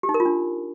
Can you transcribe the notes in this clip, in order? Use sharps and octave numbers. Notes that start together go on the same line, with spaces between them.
G4
D#4
A#4
F4
D4